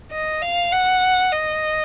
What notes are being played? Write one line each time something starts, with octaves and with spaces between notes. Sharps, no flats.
D#5
F5
F#5
D#5